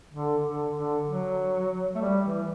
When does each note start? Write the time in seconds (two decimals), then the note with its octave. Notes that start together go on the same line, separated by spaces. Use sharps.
0.13 D3
0.45 D3
0.75 D3
1.07 F#3
1.95 A3
2.02 G3
2.25 E3